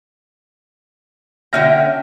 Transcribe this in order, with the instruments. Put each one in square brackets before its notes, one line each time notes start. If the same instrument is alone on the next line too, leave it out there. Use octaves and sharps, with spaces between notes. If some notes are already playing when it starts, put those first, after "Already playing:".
[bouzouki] D3 C#4 G5 [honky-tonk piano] E5 F6 A#6